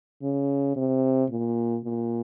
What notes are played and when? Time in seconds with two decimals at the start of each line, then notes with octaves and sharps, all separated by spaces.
0.22 C#3
0.76 C3
1.30 A#2
1.84 A#2